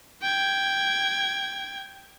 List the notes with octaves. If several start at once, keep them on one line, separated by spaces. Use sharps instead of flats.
G5 G#6